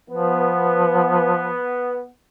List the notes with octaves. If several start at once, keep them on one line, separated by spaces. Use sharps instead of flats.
F3 B3